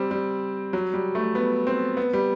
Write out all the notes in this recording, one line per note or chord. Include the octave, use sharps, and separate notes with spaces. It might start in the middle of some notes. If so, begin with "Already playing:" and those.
Already playing: G3 C4
G3
F#3
G3
A3
B3
C4
B3
G3